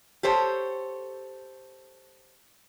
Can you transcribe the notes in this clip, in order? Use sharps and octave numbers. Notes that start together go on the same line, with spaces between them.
G4 A4 C5 C#5